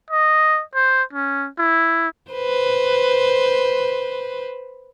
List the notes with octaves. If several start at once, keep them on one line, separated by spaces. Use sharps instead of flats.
D#5
C5
C#4
E4
B4 C5